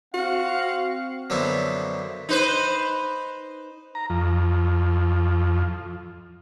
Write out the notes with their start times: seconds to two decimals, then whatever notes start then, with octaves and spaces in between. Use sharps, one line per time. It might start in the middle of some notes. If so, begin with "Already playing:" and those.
0.14 C4 F#4 F5
1.30 F#2 D3 F3 B3 D#4 E4
2.29 D#4 B4 C5
3.95 A#5
4.10 F2